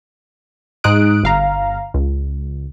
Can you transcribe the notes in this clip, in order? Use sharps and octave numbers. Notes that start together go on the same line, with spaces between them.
G#2 G#3 D#4 D#6 F#6 D7
G1 F5 A#5
C#2